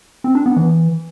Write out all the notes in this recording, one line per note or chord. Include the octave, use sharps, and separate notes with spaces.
C4
D4
B3
E3